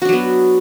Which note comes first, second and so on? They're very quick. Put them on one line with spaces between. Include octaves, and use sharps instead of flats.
F#4 D4 F#3 B3